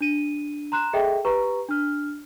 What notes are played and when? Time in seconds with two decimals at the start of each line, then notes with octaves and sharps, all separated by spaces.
0.01 D4 D#7
0.72 A#5 C6 F#6 E7
0.93 G#4 A4 D#5 E5 G5
1.25 G4 B4 A#5 C#6
1.69 D4 F6